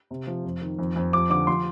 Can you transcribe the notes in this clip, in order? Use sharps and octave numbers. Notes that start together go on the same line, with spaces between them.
C3
F3
F2
D#3
F2
F2
F3 D6
D3 D6
F3 C6